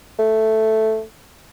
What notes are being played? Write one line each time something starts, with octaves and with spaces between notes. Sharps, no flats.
A3